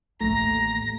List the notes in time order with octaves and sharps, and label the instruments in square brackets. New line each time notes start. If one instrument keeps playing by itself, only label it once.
[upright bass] A1 D#2 [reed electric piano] A3 [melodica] A#5 [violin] A#6